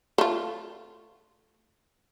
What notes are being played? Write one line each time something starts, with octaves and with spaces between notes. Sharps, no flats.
A3 F4